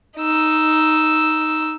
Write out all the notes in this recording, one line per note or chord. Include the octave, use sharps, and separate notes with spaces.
D#4 E6